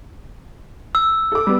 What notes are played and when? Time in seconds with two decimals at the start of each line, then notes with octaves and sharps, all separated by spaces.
0.95 E6
1.32 A4 D6
1.47 G3 B3